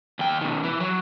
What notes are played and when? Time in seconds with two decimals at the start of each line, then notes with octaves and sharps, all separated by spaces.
0.19 D#2 G5
0.41 B2 D#3
0.64 E3
0.80 F#3